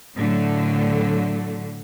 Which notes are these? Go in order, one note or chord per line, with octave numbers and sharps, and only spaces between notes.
A2 D3 F#3 A3